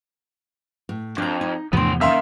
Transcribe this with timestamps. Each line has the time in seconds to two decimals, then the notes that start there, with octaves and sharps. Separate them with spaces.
0.89 A2
1.18 F2 D4 A#5
1.41 D#4
1.73 E2 A2 C3 F3 B3 D4 C6
2.01 D#3 A#3 C#4 E5 F5 C6